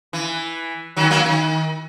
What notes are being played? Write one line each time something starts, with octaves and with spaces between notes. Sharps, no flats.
E3
D#3 F#3
F#3 A#3
D#3